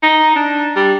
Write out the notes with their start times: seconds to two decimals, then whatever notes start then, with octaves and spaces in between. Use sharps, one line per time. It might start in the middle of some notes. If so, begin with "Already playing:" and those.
0.03 D#4
0.36 D4
0.76 G3